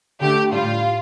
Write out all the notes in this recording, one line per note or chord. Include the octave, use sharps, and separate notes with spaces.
D3 A3 G4
A2 G3 F4